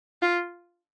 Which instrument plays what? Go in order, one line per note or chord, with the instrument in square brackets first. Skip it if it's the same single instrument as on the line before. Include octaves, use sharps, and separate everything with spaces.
[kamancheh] F4